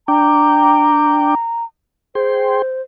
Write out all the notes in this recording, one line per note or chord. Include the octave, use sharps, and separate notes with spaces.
D4 G5 A#5 D6
G#4 C5 G5 C6